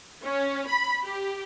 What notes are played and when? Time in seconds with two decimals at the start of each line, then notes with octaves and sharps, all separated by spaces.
0.24 C#4
0.68 B5
1.03 G4